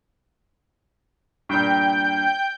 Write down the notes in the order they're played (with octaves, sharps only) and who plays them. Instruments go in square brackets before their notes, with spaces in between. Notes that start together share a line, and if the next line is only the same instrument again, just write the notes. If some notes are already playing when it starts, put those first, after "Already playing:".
[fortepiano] G2 A#2 [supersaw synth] G5 G6